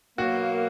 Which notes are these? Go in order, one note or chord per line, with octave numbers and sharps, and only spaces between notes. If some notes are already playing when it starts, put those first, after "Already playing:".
B2 F#3 A#3 F#4